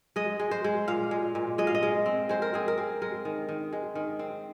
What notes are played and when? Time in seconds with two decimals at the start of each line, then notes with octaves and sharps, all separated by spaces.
0.16 G#3 D#5
0.40 G#3
0.51 C5
0.64 G#3
0.88 A#2 F5
1.11 G#3
1.35 A#2
1.58 G#3 D#5
1.67 F5
1.75 D#5
1.83 G#3
2.06 C4
2.29 G#3 C5
2.42 A#4
2.54 C4 G#4
2.68 A#4
2.78 C4
3.02 G#3 A#4
3.25 D#3
3.49 D#3
3.73 G#3
3.95 D#3
4.19 C4